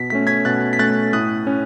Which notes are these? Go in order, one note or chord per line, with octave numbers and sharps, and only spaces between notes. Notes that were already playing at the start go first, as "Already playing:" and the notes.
Already playing: B2 B6
A3 C#4 B6
G#6 B6
B2 F#6 A6
B6
A3 C#4 F#6 A6
A2 D#6 F#6
C#4